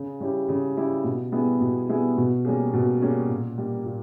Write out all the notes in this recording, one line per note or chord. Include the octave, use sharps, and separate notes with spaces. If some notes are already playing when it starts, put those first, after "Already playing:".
Already playing: C#3
G3 C#4 E4 G4
C#3
G3 C#4 E4 G4
B2
G3 B3 E4 G#4
B2
G3 B3 E4 G#4
B2
G3 A#3 C#4 G#4
B2
G3 A#3 C#4 G#4
A#2
G3 A#3
A#2